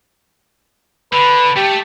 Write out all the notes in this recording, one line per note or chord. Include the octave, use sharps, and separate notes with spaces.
D3 B4
A3 G4 A4